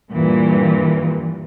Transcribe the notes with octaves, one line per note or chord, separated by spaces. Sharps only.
G2 A#2 E3